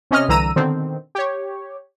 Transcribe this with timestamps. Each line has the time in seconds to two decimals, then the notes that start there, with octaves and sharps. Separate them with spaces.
0.11 C3 C#4 D#5 F6
0.28 C2 D3 E3 A#5 E6 D#7
0.56 B2 D3 D#3 C4
1.15 G4 C#5